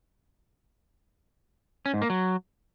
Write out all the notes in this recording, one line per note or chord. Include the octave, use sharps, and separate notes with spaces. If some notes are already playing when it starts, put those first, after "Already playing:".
C#4
G#2
A#3
F#3